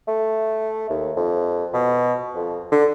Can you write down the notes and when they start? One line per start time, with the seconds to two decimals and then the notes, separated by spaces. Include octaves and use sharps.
0.08 A3
0.89 D#2
1.16 F2
1.74 B2
2.35 F2
2.72 D3